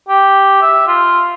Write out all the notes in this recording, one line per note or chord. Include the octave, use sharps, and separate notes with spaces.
G4
E5
F4